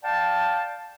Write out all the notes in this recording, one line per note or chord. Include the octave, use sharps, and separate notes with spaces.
D5 F5 G5 A5